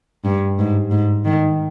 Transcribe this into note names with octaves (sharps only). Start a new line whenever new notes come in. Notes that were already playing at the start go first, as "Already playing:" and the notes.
G2
G#2
G#2
D#3